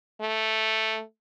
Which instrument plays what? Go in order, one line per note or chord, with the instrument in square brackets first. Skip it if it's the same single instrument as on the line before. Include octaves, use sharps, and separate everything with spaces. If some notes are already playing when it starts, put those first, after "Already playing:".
[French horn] A3